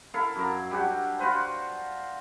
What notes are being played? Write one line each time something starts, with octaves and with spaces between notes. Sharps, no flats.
E4 A4 A#4 F5
F#2 A#4
G3 D4 F#4 G4
F4 F#4 B4 C5